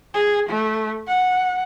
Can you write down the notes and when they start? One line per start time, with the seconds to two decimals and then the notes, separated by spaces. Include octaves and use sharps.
0.14 G#4
0.49 A3
1.07 F#5